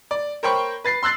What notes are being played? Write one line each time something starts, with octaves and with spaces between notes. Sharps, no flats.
D5
A#4 C5 C#5 G5 B5 C#6
B4 A6 C7
C6 E6 F#6 A6 C7